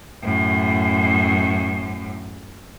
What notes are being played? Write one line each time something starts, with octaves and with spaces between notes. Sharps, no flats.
F#2 A2